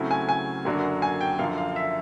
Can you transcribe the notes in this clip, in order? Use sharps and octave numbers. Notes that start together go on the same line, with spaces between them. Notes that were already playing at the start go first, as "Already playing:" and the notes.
Already playing: C#3 F#3 A3 C4 E4
G#5
G#5
F#2 D3 F#3 A#3 D4
G#5
G5
F#2 D3 F3 F5
F5
E5